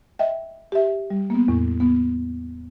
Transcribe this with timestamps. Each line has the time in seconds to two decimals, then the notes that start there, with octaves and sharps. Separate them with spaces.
0.19 D#5 E5 G5
0.72 G4 E5
1.10 G3
1.30 A#3 B3
1.48 E2 A2
1.80 B3